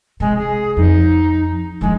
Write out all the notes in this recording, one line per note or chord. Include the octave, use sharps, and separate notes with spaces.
C3 G#3
G#4
F2 D#4
D2 F3 G#3